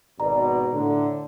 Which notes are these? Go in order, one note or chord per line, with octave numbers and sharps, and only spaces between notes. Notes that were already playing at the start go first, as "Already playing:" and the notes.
G#1 B2 D5 A#5
A2 D3